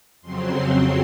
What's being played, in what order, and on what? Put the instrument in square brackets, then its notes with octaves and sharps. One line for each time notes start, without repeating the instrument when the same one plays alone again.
[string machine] F2 C#3 F#3 C4 C6